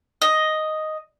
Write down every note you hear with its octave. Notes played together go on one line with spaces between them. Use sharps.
D#5